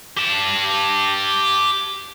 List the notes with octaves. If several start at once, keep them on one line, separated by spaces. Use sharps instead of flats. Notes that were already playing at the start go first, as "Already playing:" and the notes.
G4 A5